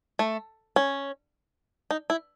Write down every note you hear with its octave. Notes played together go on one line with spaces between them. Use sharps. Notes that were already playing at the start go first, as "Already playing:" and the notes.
A3
C#4
D#4
E4